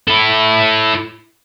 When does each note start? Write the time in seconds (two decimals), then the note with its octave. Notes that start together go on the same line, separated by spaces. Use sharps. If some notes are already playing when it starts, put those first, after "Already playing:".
0.08 E4 A4